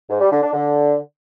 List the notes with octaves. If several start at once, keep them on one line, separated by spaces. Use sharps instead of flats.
G#2
G3
D3
D4
D3